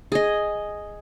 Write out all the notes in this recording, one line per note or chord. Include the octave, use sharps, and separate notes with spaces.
G#4 D#5